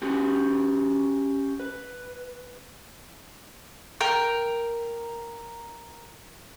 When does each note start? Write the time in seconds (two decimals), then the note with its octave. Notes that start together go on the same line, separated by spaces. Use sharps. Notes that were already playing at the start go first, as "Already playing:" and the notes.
0.02 C#4 F#4 G4
1.60 B4
4.01 A#4 G5